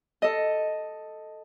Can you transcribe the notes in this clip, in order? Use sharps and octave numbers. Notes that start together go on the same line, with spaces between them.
A4 D#5